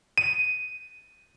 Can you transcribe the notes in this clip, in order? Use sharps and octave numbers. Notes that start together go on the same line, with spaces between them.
D#7